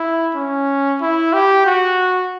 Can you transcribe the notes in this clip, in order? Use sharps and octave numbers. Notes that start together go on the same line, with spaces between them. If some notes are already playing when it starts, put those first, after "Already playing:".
Already playing: E4
C#4
E4
G4
F#4